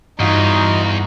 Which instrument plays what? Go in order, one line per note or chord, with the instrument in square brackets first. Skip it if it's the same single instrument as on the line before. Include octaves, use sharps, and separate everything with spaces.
[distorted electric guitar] E2 [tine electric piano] G2 G3 [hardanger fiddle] D#4 [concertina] F4 F#4 D#5